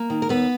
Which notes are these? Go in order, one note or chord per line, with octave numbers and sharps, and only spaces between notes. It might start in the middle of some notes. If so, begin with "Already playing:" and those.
Already playing: A#3
D#3
A#4
D#2 B3 B4